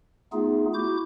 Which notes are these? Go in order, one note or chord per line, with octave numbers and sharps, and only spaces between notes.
A3 B3 D#4 F4 G#4
E4 F#4 D6 G6